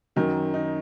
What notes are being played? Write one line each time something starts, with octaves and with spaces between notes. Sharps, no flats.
F#2 D#3 F#3
D#4